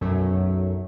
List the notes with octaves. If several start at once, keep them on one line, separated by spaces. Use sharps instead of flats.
B1 F#2 F#3 A3